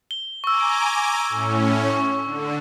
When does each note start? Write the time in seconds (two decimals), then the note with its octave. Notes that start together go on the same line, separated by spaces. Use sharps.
0.11 G7
0.44 G#5 A#5 C#6 D6 E6
1.29 A2 C#4
1.90 C#6
2.25 D3